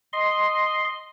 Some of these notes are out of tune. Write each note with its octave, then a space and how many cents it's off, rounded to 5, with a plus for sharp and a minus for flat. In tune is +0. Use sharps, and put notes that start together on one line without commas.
D#5 +0 C6 +0